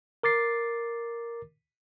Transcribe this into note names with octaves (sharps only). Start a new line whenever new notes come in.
A#4 D6 A6 C7